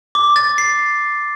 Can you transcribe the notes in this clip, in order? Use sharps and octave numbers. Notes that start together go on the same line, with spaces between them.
D6
A6
C7